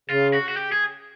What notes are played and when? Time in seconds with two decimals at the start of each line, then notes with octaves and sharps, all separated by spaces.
0.10 C#3 F4
0.33 F#4
0.48 F#4
0.57 G4
0.72 G#4